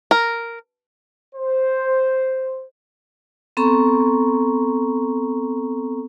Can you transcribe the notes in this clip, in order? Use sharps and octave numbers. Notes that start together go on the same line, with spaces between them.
A#4
C5
B3 C4 A4 A#5 C#6